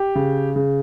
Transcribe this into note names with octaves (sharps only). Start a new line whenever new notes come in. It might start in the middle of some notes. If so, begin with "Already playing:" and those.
Already playing: G4
C#3
C#3